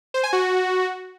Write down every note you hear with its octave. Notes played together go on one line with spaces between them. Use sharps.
C5
G#5
F#4